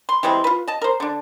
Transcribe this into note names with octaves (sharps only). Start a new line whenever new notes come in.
C6
E3 G3 G#3 C4
F4 B4
D#5 A5
A#4 C5
D3 D4